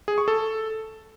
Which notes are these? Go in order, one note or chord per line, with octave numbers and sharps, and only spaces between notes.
G#4
C#6
A4